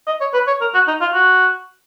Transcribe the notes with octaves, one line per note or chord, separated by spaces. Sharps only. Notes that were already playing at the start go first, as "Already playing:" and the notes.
D#5
C#5
B4
C#5
A#4
F#4
D#4
F4
F#4